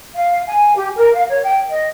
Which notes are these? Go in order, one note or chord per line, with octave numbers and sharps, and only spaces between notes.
F5
G#5
G4
A#4
F5
C#5
G5
D#5